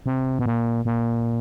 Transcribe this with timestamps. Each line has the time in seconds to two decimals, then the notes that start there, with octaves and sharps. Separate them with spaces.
0.06 C3
0.39 B2
0.46 A#2
0.85 A#2